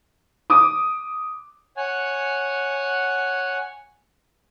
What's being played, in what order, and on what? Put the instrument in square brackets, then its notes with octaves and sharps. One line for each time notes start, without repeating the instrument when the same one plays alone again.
[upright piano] D6 D#6
[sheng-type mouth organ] C#5 F#5 G#5